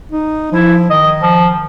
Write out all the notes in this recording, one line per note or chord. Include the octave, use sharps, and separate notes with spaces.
D#4
F3 E4
D#3 D#5
F3